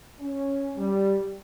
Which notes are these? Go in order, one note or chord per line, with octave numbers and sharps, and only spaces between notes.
C#4
G3